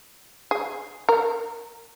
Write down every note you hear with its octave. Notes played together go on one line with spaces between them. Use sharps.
G#4
A#4